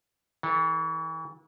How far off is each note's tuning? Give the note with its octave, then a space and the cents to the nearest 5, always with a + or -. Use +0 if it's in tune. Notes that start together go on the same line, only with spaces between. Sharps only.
E3 -35 A4 +0